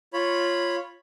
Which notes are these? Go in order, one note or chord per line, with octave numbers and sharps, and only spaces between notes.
F4 C#5 B5